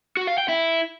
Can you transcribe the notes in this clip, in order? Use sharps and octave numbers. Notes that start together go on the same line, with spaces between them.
F#4
F5
G5
E4